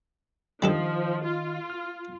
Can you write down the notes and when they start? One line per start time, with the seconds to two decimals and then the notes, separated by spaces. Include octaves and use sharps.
0.62 D#3 F3 G3 D4 A4 D#5
1.25 F4
1.70 F6